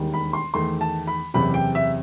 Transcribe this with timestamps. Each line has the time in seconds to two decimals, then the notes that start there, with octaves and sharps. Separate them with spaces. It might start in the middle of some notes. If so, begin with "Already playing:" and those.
Already playing: E1 D#2 D#3 G3
0.14 B5
0.33 C6
0.54 E2 D#3 A3 C6
0.81 A5
1.07 B5
1.34 F#1 E2 C3 B5
1.54 G5
1.75 E5